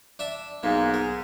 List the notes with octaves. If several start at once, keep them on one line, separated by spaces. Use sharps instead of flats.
D4 E5
B1 G#2 A#3
A#4